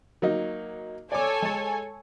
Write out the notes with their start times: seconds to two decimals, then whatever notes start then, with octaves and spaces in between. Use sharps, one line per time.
0.22 F#3 A#3 D#4
1.12 A4 C#5 D5 G#5 D6
1.42 G#3 A5